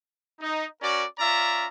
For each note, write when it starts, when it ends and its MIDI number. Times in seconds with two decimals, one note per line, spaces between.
0.40 0.65 63
0.82 1.04 61
0.82 1.04 66
0.82 1.04 70
0.82 1.04 74
1.19 1.67 61
1.19 1.67 65
1.19 1.67 74
1.19 1.67 76
1.19 1.67 82